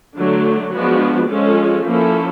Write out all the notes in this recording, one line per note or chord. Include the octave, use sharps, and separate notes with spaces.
D3 F#3 A3 D4
F3 G#3 B3 D4 F#4
F3 G#3 C#4 F4 A4
F3 A#3 C#4 E4 A4